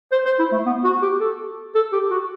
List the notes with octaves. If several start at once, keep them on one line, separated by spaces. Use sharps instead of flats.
C5
C5
E4
A3
B3
F#4
G4
A4
A4
G4
F#4